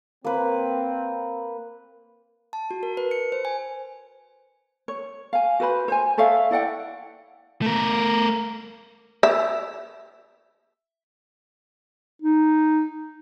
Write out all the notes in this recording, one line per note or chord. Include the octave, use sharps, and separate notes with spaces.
A#3 C4 B4
A5
F#4
A#4
B4
C#7
C5
G#5
C#5
F5 G#5
F#4 B4 C5 B5
C5 G#5
A4 C#5 E5 F5
E4 D5 F#5 G5
A3 A#4
E5
D#4